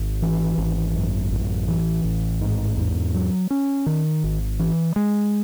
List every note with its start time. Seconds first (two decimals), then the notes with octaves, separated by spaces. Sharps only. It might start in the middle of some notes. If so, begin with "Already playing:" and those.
Already playing: G#1
0.22 E3
0.58 G#1
0.95 F#2
1.31 A1
1.68 E3
2.04 A1
2.41 G#2
2.77 E2
3.14 F#3
3.51 C#4
3.86 D#3
4.24 G#1
4.60 E3
4.96 G#3